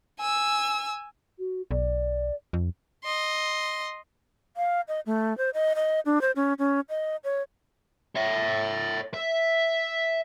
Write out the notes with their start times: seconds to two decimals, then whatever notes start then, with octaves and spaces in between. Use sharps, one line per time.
0.20 G#5 E6
1.39 F#4
1.71 B1 D5
2.53 F2
3.04 D#5 C6
4.57 F5
4.88 D#5
5.06 A3
5.38 C5
5.54 D#5
5.75 D#5
6.06 D4
6.21 C5
6.36 C#4
6.59 C#4
6.89 D#5
7.24 C#5
8.16 C#5 E5
9.14 E5